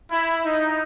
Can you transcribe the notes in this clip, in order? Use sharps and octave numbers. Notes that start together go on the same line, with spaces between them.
E4
D#4